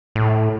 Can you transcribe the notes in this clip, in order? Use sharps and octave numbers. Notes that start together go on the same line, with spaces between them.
A2